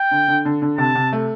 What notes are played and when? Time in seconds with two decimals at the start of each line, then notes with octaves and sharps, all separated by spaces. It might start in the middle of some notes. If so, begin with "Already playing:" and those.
Already playing: G5
0.11 D3
0.28 D3
0.45 D3
0.62 D3
0.78 C3 A5
0.95 C3
1.13 A3